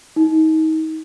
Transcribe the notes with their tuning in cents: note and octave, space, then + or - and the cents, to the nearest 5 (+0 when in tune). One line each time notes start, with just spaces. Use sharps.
D#4 +30